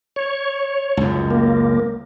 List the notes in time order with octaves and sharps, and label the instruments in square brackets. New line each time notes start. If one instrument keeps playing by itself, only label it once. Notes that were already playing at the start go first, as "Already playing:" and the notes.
[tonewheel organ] C#5
[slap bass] C#2 F#2
[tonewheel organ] A#3